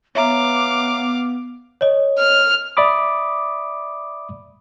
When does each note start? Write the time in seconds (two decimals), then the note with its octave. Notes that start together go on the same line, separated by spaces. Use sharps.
0.15 B3 C#5 E5 F5 A#5 D6
1.81 C#5 D#5
2.18 F6
2.77 D5 E5 B5 D6 D#6